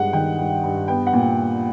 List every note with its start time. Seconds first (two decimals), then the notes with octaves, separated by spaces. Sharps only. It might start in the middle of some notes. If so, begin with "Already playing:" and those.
Already playing: G2 G#3 F#5
0.13 D#3 G5
0.39 G2
0.64 G2
0.88 B3 G5
1.07 F#5
1.13 A#2